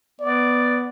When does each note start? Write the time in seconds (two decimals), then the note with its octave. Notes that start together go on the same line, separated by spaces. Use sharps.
0.21 B3 D5